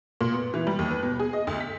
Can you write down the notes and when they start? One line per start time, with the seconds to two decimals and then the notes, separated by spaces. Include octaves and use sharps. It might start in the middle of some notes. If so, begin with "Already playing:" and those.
0.21 A#2
0.34 B3
0.54 E3
0.67 G3
0.79 D#2
0.91 B4
1.02 B2
1.19 G#4
1.33 D#5
1.47 D2
1.60 B6